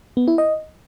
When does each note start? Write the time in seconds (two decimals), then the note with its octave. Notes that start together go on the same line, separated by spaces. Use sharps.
0.17 B3
0.28 E4
0.38 D#5